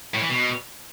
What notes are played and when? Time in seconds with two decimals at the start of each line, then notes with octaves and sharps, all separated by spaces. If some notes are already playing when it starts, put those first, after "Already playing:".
0.14 A2
0.21 E3
0.29 B2